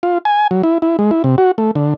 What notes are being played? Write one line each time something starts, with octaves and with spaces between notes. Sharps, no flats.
F4
G#5
F#3
E4
E4
G#3
E4
C3
F#4
A3
D3